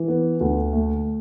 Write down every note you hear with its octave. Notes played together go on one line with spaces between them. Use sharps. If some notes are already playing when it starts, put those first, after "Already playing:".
Already playing: E3
B3
D2
A3